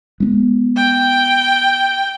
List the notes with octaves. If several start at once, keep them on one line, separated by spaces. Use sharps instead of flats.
G#3 B3
G5